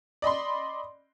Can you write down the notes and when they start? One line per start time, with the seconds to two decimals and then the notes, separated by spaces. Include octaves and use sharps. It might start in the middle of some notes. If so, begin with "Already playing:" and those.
0.22 D5 D#5 B5 C6